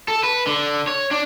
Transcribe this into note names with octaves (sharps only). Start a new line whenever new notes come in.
A4
B4
D3
C#5
D4